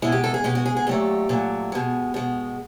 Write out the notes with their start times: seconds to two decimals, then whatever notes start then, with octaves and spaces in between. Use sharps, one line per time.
0.02 B2 G#3 E4
0.12 G4
0.24 A4
0.34 G#4
0.44 B2 G#3 G4
0.55 F#4
0.65 G#4
0.77 G#4
0.87 A#2 F#3 A3 G4
1.29 A#2 F#3 A3
1.72 B2 G#3
2.14 B2 G#3